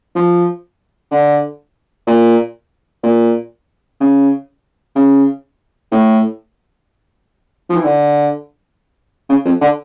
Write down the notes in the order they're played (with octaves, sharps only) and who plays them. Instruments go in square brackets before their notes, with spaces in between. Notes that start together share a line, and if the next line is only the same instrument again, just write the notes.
[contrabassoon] F3
D3
A#2
A#2
C#3
C#3
A2
F3
E3
D3
C#3
F2
D3